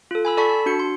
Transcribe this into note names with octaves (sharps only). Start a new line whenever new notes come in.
F4 A4
G#5 B5 E6
A4 D5 A5 B5 C#6 B6
A5
D4 F#4 C#7
C6